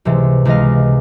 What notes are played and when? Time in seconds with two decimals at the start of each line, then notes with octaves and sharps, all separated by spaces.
0.05 C#2 C3 E3 G#3
0.45 C#2 C3 E3 G#3 D#5 F5